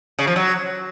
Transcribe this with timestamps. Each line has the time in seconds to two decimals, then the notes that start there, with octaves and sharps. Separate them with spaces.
0.19 C#3
0.27 F3
0.36 F#3